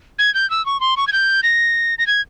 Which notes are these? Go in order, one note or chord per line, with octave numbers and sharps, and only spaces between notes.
G#6
G6
E6
C#6
C6
C#6
G#6
G6
A#6
A#6
G#6